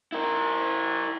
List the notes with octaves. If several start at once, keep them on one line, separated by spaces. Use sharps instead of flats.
E4 A#4